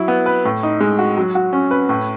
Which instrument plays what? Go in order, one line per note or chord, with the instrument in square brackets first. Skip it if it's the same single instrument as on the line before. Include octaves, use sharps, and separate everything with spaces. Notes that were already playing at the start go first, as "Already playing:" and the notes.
Already playing: [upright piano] F#3 E4
B3
B4
A2
D#4
G#3
F#4
F#3
F#4
C#4
B4
A2